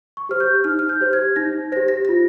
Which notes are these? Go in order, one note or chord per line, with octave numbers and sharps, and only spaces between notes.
C#6
G4 C5 F6
G6
D#4 F6
F6
G6
G4 C5
G#6
D#4 A#6
G4 C5 A#6
A#6
A#6
F4